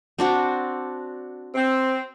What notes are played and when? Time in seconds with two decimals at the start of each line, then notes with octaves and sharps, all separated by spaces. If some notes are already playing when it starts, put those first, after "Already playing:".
0.19 C4 D4 F#4
1.55 C4